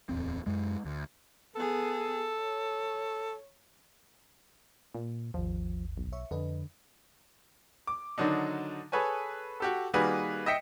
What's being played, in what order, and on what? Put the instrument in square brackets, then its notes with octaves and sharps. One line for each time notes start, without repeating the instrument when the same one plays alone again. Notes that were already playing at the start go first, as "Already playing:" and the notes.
[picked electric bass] D1 E2 C4
F#2 G#3
D2
[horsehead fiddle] B3 G#4 [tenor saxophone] A4
[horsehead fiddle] C#5
[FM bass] A#2
[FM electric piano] G#1 D#2 [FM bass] F3
[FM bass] B1
[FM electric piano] C#5 E5 C#6
[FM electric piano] F2 B4 D#5 [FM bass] D3
[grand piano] D6
D3 D#3 F#3 D4 D#4
G#4 A4 B4 C#5 G#5
F#4 G4 A4
D#3 G3 A#3 F#4 G#4 B4
D#5 E5 G5 B6 C#7